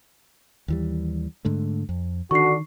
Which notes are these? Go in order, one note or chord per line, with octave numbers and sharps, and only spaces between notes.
D#2 E3 G3
G#2 D3 A3
F2
D3 D#3 D4 F#4 C#6 C7